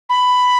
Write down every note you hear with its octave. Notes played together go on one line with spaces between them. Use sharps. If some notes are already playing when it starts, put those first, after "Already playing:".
B5